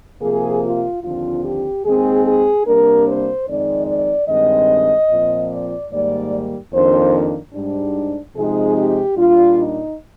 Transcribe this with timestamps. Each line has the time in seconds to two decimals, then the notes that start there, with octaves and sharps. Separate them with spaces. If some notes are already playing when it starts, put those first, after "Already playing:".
0.21 C3 F3 A#3 G#4
0.62 F4
1.03 D#2 D3 F3 C4 F4
1.44 G4
1.84 D#2 D#3 G#3 C4 G#4
2.25 G#4
2.65 C3 G3 A#3 D4 A#4
3.07 C5
3.47 F2 D#3 G#3 C4 D#4 D5
3.87 D5
4.28 G2 D#3 G#3 C4 D#5
5.10 A#2 F3 C4
5.51 D5
5.91 G#2 D#3 G3 A#3 D5
6.72 F2 D#3 A#3 D4 C5
7.54 G#2 G3 D4
8.35 C3 F3 G#3 C4 D#4 G#4
8.76 G4
9.17 A#2 G3 D4 F4
9.57 D#4